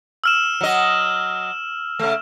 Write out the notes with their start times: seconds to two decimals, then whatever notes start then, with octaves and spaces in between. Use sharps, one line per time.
0.24 E6 F6 E7
0.61 F#3 D#5
1.99 C#3 A3